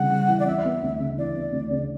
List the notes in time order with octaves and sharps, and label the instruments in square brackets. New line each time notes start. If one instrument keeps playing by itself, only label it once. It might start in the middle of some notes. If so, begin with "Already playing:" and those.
Already playing: [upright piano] C#3 E3 G3 [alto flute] F#5
[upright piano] C#3
E3
[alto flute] D5
[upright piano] E3 [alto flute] E5
[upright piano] B3
D2
C#3
[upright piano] E3 [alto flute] D5
[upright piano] B3
D2
C#3